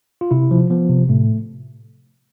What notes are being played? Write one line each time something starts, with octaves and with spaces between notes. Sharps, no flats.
F4
C3 E4
F3
F3 B3
C3
A2 A3